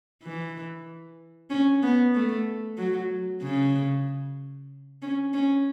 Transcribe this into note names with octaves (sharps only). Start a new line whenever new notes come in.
E3
C#4
B3
A3
F#3
C#3
C#4
C#4